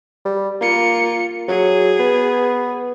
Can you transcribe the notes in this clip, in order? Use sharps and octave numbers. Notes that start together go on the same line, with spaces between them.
G3
A#3 F4 C#7
F#3 G#4
B3